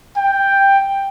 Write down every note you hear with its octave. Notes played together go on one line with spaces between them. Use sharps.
G5